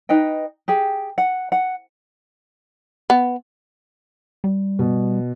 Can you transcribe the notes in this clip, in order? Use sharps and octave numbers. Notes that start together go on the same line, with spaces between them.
D#4 B4 D#5 G5
G4 G#4 G5
F#5
F#5
B3
G3
B2